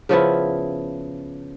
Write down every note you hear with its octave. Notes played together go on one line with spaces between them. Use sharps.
C#3 F3 B3 E4